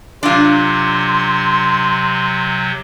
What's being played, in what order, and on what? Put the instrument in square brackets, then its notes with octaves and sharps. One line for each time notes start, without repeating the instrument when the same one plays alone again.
[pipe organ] C3 F#3 [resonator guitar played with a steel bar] D4 F4 [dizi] C6